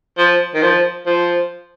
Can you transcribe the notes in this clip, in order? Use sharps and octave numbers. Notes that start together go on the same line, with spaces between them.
F3
D#3
F3
F3